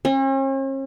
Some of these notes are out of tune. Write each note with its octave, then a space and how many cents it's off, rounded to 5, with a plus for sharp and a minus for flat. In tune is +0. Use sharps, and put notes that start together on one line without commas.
C#4 -45